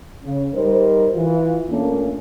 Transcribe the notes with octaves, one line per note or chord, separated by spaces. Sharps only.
C#3
G3 D#4 A#4 C5
E3 F4
A#2 A3 A#3 C#4 D4